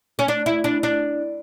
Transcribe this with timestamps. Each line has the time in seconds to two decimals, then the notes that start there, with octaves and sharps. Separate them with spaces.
0.19 C#4
0.28 D4
0.46 E4
0.64 D4
0.83 D4